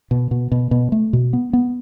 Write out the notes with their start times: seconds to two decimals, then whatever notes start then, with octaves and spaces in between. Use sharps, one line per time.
0.11 B2
0.31 B2
0.52 B2
0.71 B2
0.92 A3
1.13 B2
1.33 B3
1.53 B3